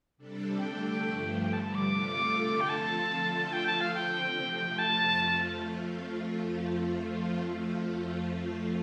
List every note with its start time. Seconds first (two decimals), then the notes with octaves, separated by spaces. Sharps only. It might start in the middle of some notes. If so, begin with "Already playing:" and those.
0.17 C3 G3 D4 A4
0.58 D3 A3 D4 A4 G5
1.01 G2 F3 A3
1.43 G2 D3 G3 G5
1.53 A5
1.64 A5
1.75 D6
1.84 C3 A3 F4 A4
2.27 D3 A3 F4 A4
2.60 G5
2.69 F3 C4 F4 A4 A5
3.11 D3 A3 F4 A4
3.52 F3 A3 F4 A4 G5
3.67 A5
3.81 F5
3.94 D3 F3 C4 G5
4.36 C3 F3 A3
4.78 F2 F3 A3 F4 A5